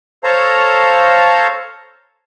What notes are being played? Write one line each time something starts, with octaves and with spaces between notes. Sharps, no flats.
A4 C5 C#5 F5 A5 A#5